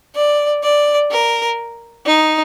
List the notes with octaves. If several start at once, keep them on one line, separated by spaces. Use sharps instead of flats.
D5
D5
A#4
D#4